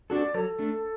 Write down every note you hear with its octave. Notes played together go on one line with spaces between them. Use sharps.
D4 F#4 A4 D5
F#3 A4
A3 D4